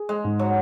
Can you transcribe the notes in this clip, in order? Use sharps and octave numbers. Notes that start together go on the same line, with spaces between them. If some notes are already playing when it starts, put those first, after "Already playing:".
Already playing: G#4
G#3
G#2
F#3